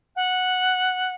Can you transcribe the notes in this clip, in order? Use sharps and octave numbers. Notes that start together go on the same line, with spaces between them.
F#5